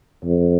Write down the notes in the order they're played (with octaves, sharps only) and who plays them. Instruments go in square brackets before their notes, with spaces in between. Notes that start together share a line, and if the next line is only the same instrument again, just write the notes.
[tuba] F2